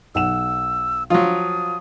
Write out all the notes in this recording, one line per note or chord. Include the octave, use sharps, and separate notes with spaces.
B1 F#5 E6 E7
F3 F#3 F4 D#6